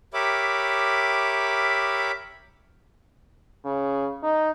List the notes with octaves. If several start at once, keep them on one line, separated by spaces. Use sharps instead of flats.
G4 A#4 C#5 E5 B5 D6
C#3
D#4